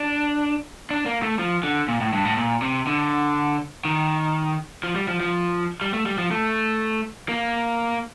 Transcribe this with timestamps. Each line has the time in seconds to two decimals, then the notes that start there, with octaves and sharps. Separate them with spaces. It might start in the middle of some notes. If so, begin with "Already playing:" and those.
Already playing: D4
0.91 D4
1.06 A#3
1.23 A3
1.39 F3
1.64 D3
1.88 A#2
2.01 A2
2.13 G2
2.25 A2
2.37 A#2
2.62 C3
2.87 D3
3.85 D#3
4.83 F3
4.96 G3
5.08 F3
5.20 F3
5.81 G3
5.94 A3
6.06 G3
6.18 F3
6.31 A3
7.29 A#3